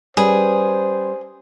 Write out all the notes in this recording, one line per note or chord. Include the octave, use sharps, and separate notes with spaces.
G3 C#4 G#4 B4 C5